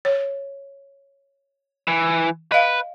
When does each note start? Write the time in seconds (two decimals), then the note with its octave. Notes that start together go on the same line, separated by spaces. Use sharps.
0.05 C#5
1.88 E3
2.52 B4 D#5 F5